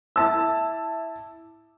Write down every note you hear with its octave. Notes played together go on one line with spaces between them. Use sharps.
E4 A5 E6